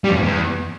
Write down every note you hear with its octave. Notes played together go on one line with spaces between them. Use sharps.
G3
F2
G#2
E2